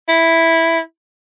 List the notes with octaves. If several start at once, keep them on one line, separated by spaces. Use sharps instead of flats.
E4